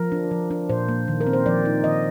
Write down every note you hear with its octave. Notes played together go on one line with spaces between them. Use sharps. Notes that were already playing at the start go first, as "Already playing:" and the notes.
Already playing: F3 A#4
D4
F3
D4
A#2 C5
A#3
D#3
A#4
C4
C5
F3 D5
D#4
D#3 D#5